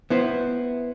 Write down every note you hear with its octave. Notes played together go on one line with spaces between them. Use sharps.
B3 E4 C5